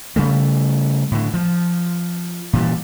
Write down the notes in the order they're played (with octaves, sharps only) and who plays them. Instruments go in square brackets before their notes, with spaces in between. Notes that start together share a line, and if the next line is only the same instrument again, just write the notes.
[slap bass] C#3 G3 A3
A2 D3
F3
A#2 E3 G3